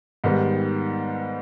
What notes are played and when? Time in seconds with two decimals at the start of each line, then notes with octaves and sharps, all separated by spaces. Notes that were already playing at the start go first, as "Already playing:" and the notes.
0.24 G#2 D#3 G3 B3